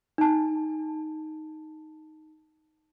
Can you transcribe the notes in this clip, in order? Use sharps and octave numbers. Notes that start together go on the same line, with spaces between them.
D#4 A5